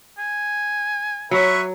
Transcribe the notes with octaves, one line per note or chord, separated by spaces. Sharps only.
G#5
F#3 B4 C#5 E5